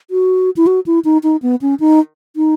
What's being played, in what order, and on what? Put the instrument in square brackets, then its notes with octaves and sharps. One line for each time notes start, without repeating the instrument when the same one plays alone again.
[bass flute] F#4
E4
F#4
E4
D#4
D#4
B3
C#4
D#4
D#4